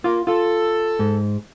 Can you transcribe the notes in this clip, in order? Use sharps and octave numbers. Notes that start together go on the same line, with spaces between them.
A#3 F4
F4 A4
G#2